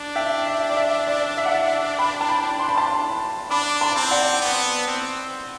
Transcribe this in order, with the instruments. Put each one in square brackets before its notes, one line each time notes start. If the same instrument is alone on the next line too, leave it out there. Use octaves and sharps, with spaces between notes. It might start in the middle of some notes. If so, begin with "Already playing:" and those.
Already playing: [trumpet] D4
[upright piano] E5 G5
E5
D5
E5
D5
E5
F#5
E5
G5 B5
A5
G5 B5
C6
B5
A5 C6
[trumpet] D4 [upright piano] B5 D6
[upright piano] A5 C6
[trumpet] C4
[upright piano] D5 F#5
[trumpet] B3
C4